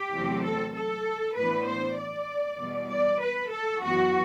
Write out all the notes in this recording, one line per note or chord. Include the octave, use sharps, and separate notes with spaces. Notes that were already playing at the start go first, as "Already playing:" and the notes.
Already playing: G4
E2 C3 F#3 A3 C4
A4
A4
A2 E3 B3 D4 B4
C5
D5
E2 B2 G3 B3
D5
B4
A4
F#2 E3 B3 F#4